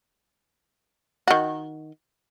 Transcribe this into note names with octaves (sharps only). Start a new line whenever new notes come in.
D#3 F#4